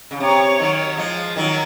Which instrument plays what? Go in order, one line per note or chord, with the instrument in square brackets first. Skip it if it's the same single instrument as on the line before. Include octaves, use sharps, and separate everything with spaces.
[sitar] C#3
[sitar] C3 [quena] C#5
[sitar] D#3 F#3
F3 G#3
D#3 F#3